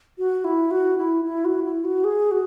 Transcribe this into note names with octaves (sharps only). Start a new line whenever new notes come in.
F#4
E4
F#4
E4
E4
F#4
E4
F#4
G#4
F#4